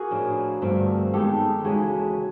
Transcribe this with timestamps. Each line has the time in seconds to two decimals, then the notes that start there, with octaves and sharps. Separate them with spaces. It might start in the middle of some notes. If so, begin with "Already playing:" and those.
Already playing: A#3 F#4 G#4
0.11 A2 F3 A3 D4
0.62 G2 D3 F3 A3 C4
1.14 D#3 G#3 B3 D#4 G4 A4
1.64 D#2 C#3 E3 G#3 F#4 G#4